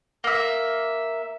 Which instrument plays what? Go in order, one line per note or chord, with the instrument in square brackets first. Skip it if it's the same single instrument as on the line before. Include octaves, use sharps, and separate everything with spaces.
[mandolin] A#3 E5